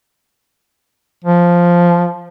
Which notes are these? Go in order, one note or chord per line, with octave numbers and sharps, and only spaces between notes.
F3